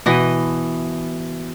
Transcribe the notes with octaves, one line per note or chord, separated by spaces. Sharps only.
B2 E3 D#5